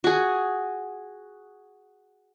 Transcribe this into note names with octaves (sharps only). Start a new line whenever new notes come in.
F#4 G#4